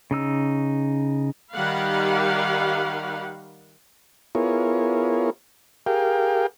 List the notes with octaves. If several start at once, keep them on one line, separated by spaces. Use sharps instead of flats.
C#3 D#4 E6
D#3 G3 G4 F5 F#5 B5
B3 E4 F4 G#4 A#4 C#5
G4 G#4 A#4 F5 G5